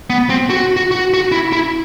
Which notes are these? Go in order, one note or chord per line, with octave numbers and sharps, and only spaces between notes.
B3
C4
F#4
F#4
F#4
F#4
E4
E4